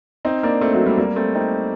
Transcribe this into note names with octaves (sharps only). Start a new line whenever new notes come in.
C4 D#4
A#3 D4
A3 C4
F#3 A3
G3 A#3
G3 A#3
A3 C4
C4 D#4